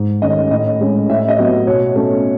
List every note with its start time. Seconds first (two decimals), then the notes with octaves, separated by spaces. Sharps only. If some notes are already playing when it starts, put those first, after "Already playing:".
Already playing: G#2
0.22 D#3 A3 C#4 D#5
0.51 A2 D#5
0.80 G#3 C#4
1.09 A2 E5
1.19 E5
1.28 D#5
1.38 F#3 B3
1.67 B2 C#5
1.95 A3 C#4